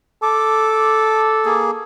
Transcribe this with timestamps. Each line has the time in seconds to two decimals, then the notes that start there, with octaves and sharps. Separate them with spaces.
0.23 A4 D6
1.45 A#3 G#4